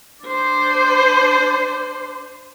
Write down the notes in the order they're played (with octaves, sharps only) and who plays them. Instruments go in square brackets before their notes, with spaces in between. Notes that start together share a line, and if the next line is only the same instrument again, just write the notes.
[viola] D4 C5